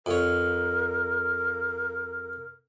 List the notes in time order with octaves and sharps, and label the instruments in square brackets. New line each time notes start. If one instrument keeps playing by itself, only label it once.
[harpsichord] F2 C#5 [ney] A#4